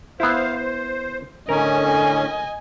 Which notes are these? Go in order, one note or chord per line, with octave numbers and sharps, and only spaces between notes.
B3 E4 C5 F5
C5
A2 D3 C#4 A#4 D#5 G#5